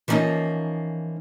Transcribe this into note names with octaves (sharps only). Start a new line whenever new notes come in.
E3 F3 G3 A#3 C#4 D#4